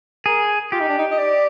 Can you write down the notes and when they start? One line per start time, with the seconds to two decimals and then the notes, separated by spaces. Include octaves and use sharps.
0.26 G#4 A#4
0.72 F4 G4
0.80 D#4
0.89 D4
0.98 D#4
1.11 D#5
1.18 D5